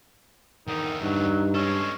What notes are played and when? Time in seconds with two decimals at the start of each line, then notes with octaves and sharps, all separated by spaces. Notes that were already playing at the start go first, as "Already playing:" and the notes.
0.67 E2 D3 D#3 D#4
1.02 G2 F#3 D#4
1.55 G#3 C#4 A4